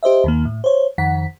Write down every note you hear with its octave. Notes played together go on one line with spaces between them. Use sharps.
G4 C5 D#5 E5
D#2 D#3 A#3
A2
C5 C#5
F2 D#3 F#5 B6